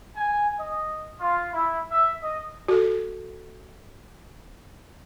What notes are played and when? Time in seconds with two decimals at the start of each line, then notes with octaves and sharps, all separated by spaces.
0.16 G#5
0.59 D#5
1.20 F4
1.53 E4
1.91 E5
2.22 D#5
2.68 F#4 A4